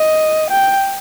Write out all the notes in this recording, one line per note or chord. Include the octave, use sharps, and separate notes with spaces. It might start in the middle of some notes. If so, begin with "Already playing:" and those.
Already playing: D#5
G5